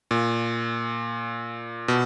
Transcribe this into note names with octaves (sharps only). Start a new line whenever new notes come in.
A#2
B2